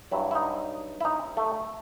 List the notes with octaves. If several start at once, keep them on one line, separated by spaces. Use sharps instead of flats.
G2 F#3 E4
E4
D#4
E4
D#4
A3